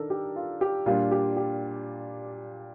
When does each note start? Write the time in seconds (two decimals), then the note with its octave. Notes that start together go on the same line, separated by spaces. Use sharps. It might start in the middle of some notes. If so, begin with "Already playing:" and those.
Already playing: D#3 D4 A4 A#4
0.10 G4
0.36 F4
0.61 G4
0.86 A#2 G3 D4 F4
1.11 G4
1.36 G4